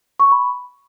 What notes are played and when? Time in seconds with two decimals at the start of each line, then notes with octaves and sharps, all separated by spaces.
0.20 C#6
0.32 B5